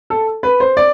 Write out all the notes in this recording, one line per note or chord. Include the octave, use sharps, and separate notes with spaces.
A4
B4
C5
D5